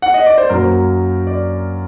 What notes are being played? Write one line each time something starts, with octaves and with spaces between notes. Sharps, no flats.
F#5
D#5
D5
C5
F#2 F#3 A#3 A#4
D5